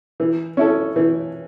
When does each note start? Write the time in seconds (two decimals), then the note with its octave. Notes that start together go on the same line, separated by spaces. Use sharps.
0.20 E3
0.57 C#4 E4 A4
0.96 E3